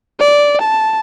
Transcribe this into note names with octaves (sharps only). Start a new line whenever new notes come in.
D5
A5